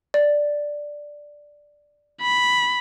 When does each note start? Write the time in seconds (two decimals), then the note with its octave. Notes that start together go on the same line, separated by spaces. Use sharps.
0.14 D5
2.22 B5